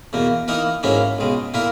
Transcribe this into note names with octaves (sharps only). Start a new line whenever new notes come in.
E2 B2 A#3
E3 A#3 D#4 A#4
G#2 F#3 A#3 C#4 E4
C#2 B2 G#3
A#2 A#3 E4 A#4